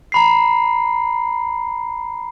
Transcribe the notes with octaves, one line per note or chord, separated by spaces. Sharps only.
A#5 B5 C7